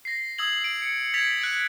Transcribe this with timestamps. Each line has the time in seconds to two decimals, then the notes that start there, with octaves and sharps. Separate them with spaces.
0.05 A#6 C7
0.38 D#6 E6 G#6 F#7
0.64 D7
0.82 C#7
1.13 G#6 A6 B6 F7
1.42 F#6 D7